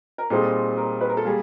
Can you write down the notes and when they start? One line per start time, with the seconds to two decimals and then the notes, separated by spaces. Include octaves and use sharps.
0.18 A#4
0.30 A#2 G3 C4 D#4 G#4 A4
0.77 A#4
1.01 B4
1.09 A#4
1.17 A4
1.25 G3 A#3 G#4